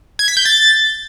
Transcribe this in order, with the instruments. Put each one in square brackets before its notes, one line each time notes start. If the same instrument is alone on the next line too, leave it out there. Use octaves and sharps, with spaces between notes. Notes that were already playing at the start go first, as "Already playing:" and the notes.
[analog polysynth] G#6
B6
G6
A6